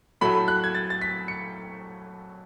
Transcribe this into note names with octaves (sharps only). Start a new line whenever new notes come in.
A2 F#3 A3 B5
F#6
G#6
A6
A6
B6
C#7